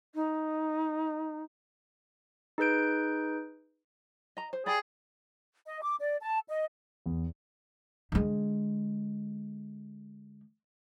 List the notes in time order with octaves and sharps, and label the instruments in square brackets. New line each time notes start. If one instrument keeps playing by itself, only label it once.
[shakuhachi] D#4
[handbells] D#4 G#4 B4 G6 D7
[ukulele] D#5 A#5
C5
[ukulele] G4 D5 B5 [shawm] G#4
[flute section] D#5
D6
D5
A5
D#5
[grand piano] E2
[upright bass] D3 G#3